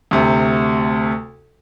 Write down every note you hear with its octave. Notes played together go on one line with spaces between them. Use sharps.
D2 C3